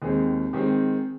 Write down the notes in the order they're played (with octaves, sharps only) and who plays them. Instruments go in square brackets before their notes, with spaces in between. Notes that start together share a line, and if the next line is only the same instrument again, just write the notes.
[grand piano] D#2 D#3 G#3 C4 G#4
D#3 G#3 C4 G4